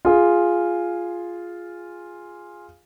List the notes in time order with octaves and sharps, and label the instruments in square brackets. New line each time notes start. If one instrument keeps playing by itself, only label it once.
[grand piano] F4 G#4